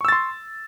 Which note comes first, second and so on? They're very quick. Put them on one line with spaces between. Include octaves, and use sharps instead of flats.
C#6 E6 A6 C6